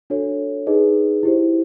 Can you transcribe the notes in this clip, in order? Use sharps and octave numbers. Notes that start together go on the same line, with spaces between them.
D4 F#4 A4 C#5
D#4 G#4 B4 D#5
E4 G4 C5